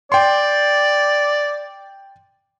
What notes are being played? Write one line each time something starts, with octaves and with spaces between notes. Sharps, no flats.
D5 G5 C6